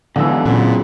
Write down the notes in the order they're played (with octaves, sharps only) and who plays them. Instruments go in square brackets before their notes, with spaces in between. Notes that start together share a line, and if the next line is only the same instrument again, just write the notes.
[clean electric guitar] E2 G#2 B2 [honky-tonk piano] D3 E3 [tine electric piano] F5 G#5 E6
[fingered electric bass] A#2 [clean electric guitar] C#3 F#3 [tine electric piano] A#3 C4